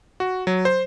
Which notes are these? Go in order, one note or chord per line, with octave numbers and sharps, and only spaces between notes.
F#4
F#3
C5